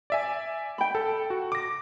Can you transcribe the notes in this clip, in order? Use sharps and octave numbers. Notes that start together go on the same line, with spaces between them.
D5 E5 G#5
G5 B5
A4
F#4
D6 A#6